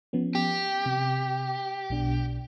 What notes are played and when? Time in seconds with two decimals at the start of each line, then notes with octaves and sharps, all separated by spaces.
0.13 F3 B3 C#4
0.35 G4
0.86 C3
1.90 B1 B2 D4